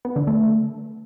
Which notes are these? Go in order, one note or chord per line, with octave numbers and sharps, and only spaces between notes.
B3
D3
A3